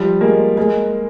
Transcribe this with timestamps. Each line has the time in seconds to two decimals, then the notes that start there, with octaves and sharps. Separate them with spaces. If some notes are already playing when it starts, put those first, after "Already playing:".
Already playing: F3 G3
0.21 G#3 A#3
0.57 G#3 A#3